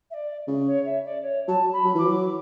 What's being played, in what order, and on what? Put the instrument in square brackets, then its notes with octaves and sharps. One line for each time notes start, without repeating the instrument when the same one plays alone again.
[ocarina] E5
D5
[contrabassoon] C#3
[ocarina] C#5
E5
D5
C#5
[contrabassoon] F#3 [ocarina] A5
[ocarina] B5
[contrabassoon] F#3
[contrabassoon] E3 [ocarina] D6
[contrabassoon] F#3